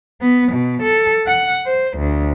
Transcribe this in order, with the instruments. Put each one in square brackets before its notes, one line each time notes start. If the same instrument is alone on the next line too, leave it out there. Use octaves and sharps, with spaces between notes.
[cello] B3
B2
A4
F#5
C5
D2